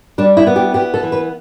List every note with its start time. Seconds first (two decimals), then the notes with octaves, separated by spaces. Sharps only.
0.18 G3 D4
0.37 E4
0.47 B3
0.56 G4
0.74 B3 G4
0.94 A4
1.03 E3
1.12 B4